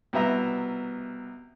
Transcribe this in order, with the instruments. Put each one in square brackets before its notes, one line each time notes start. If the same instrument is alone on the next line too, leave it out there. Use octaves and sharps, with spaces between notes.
[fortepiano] C2 B2 B3 E5 A#5